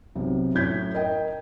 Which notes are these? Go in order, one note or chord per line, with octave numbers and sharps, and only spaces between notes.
B1 C3
F#2 A2 A3 G6 G#6 B6
A#4 D#5 G5